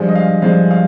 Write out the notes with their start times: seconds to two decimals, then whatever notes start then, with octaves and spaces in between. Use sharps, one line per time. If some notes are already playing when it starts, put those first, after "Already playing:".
Already playing: G2 F3 G#3
0.09 D#5
0.15 F5
0.42 G2 F3 G#3 F5
0.71 F5